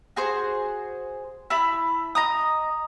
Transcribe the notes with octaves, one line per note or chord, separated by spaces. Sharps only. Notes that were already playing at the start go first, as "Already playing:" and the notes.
F#4 G#4 C5
E4 A5 B5
D#5 A#5 D#6